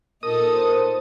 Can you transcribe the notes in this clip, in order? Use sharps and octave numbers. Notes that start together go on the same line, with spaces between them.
A#2 D#4 A4 A#4 D#6
C5